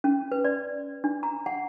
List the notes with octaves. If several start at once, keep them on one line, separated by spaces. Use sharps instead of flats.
C#4
B4
D5
D4
A#5
F#5